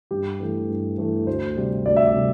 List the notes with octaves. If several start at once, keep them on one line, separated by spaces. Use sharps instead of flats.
G2 G4
E3 A3
G2
E3 A3
D2 C5
C3 G3
D2 D5
E5
D5
C3 G3